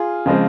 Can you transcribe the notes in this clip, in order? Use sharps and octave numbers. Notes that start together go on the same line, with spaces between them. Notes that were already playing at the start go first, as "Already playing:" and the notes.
Already playing: F4 G#4
C#3 F3 G#3 C4